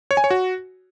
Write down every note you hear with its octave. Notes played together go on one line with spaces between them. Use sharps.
C#5
G#5
C#5
F#4